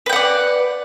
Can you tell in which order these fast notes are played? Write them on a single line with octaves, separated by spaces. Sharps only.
B4 G5 F#5 D5